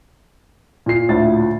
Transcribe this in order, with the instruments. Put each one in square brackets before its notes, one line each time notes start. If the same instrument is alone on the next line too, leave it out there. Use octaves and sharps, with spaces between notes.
[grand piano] A#2 C7
[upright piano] D2 A2 A6